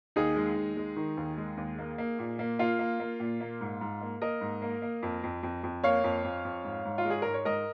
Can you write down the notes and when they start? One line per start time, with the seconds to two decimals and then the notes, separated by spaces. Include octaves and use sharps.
0.16 D#2 D#4 G#4
0.36 G#3
0.56 D#2
0.77 G#3
0.96 D#3
1.17 D#2
1.37 G#3
1.57 D#2
1.79 A#3
1.98 A#3
2.19 A#2
2.39 A#3
2.59 A#3 F4
2.79 A#3
3.00 A#3
3.20 A#2
3.40 A#3
3.61 G#2
3.81 G#2
4.01 A#3
4.22 A#3 A#4 D#5
4.41 G#2
4.62 A#3
4.82 A#3
5.03 F2
5.24 F2
5.43 F2
5.63 F2
5.84 A#3 C#5 F5
6.04 F2
6.24 F2
6.45 F2
6.65 G#2
6.85 G#2
6.98 F4
7.05 G#3
7.10 G#4
7.22 G#2 A#4
7.34 C#5
7.45 G#2 A#4 D#5